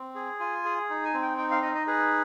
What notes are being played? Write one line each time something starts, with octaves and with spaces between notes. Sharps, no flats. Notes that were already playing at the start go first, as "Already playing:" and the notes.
Already playing: C4
G#4
F4 G#5
G#4
D#4
G#5
C4
G5
D#4 G5
F5
D#4 D#5
D#5
G#4 B4